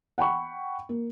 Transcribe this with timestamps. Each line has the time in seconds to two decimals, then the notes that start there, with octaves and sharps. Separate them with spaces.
0.18 F#5 G5 B5 C#6
0.89 A#3